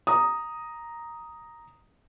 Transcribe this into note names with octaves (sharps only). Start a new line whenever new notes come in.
A#5 D#6